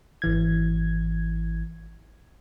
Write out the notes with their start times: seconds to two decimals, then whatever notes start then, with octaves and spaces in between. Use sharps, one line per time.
0.22 G#1 E3 G#6